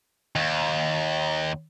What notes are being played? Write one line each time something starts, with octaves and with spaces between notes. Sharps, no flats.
D#2